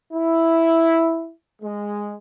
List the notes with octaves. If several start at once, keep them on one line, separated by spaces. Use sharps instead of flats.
E4
G#3